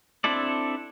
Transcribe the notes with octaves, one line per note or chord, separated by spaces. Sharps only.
C4 D4 E4 A4 D5